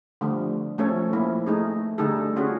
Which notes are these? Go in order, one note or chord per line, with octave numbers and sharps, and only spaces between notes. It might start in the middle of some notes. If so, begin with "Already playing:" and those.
D3 F3 G3 A3
F3 A3 C#4 A4 C#5
F3 A#3 E4
A3 D#4 G#4
D3 G3 A3 D#4 G#4 A4
C#4 F4 F#4 G#4